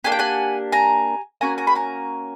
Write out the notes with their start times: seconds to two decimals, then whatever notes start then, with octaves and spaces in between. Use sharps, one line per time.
0.04 A#3 D4 G4 G#5
0.12 G5
0.19 F#5 G#5
0.72 G#5 A#5
1.41 A#3 C#4 F#4 G#5 A#5
1.58 G#5 A#5
1.67 B5
1.75 G#5 A#5